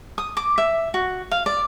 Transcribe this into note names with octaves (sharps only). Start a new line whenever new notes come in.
D#6
D6
E5
F#4
F5
D5